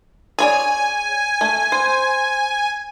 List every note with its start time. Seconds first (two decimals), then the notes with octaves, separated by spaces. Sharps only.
0.39 G#4 C#5 D5 G#5
1.41 A3
1.72 C5